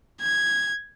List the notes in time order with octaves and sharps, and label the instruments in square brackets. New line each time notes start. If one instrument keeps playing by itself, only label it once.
[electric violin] G#6